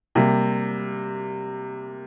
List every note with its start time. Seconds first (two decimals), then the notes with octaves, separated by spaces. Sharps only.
0.15 C3 G3 A#3